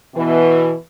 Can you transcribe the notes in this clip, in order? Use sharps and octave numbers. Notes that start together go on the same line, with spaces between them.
B2 E3